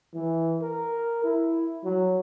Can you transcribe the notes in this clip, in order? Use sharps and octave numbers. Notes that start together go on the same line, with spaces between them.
E3
A#4
E4
F#3